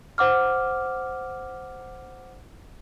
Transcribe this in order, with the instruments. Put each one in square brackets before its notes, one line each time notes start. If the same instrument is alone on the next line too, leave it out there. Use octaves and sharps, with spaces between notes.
[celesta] C5 F#5 D6 F6